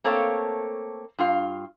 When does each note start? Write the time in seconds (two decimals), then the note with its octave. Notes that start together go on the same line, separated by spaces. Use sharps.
0.04 A3 A#3 C4 A4 C#5 F5
1.19 G2 F4 F5